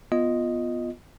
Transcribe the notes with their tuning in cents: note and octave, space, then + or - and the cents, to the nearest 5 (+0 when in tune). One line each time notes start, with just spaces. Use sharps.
B3 +0 F4 +0 D#5 +0